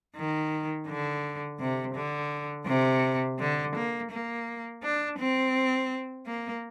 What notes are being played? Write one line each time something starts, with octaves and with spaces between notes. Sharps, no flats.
D#3
D3
C3
D3
C3
D3
A#3
A#3
D4
C4
A#3